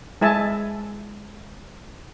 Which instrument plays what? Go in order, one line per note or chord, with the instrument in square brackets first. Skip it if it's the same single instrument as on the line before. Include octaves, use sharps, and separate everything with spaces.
[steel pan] G#3 E4 E5 G#5 A5